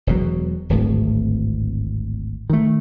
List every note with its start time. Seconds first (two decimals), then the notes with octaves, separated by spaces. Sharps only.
0.07 E1 B2 F#3
0.69 D1 G#1 A2
2.50 D#3 A3